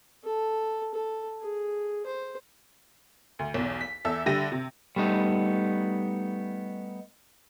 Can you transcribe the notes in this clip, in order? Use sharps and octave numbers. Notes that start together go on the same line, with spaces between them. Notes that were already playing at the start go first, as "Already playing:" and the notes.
A4
A4
G#4
C5
D2
B1 E2
B6
E2 A4 E5 E6
D3 G3 G4 E5 A#6 D#7
C3
G3 A3 B3 D#4